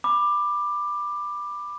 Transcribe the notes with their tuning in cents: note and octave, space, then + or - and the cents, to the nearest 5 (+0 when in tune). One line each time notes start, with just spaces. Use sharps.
B5 +0 D6 +15